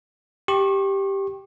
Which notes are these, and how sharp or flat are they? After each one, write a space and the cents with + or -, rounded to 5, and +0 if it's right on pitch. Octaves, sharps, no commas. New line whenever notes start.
G4 +0 C#6 -35